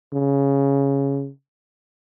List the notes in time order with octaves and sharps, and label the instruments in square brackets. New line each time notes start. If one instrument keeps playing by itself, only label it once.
[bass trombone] C#3